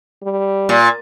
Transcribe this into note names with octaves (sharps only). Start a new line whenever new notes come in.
G3
A#2